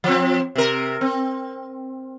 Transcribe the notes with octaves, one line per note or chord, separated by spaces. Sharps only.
F3 C4
C3 A#4
C4